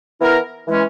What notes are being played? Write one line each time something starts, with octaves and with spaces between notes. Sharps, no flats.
E3 B3 E4 A#4
E3 G#3 C#4